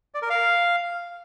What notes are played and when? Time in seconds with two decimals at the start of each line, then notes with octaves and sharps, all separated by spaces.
0.14 D5
0.22 A#4
0.30 F5